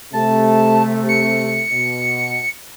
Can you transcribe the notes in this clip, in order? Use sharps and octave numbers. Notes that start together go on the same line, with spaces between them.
C3 A3 A5
C#7
B2